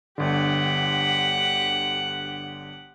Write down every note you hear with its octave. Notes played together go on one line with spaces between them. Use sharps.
G1 D3 G4 F#5